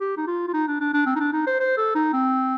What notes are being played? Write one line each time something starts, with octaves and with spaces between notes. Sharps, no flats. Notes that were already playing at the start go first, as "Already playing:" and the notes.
G4
D#4
F4
F4
D#4
D4
D4
D4
C4
D#4
D4
D#4
C5
C5
A4
D#4
C4